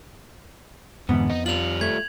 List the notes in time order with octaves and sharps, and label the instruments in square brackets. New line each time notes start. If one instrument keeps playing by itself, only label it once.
[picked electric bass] F2 D3 E3 [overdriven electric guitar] G#2 [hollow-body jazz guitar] B3
[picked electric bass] F2 [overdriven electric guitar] D#4
[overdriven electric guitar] G3 F4 [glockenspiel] F7 F#7
[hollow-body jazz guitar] A3 [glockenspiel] G#6